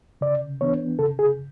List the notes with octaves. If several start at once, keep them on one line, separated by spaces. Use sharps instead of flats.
C#3 D5
E3 B3 D4 C#5
C#3 A4
G#4